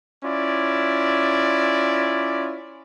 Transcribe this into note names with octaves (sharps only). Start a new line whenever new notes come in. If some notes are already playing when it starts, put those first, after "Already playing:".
C#4 E4 F4 D5